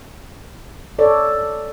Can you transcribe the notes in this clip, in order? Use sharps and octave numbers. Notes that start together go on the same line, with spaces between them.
A4 C#5 D5